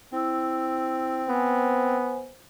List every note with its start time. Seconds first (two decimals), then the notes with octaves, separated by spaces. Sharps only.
0.12 C4 E4 E6
1.29 B3 C5 G#5